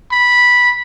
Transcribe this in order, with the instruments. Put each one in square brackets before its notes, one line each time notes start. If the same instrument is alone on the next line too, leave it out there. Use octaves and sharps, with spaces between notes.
[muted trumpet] B5